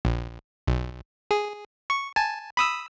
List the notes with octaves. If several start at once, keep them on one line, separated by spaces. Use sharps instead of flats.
A#1
B1
G#4
C#6
G#5 A5
B5 D#6 E6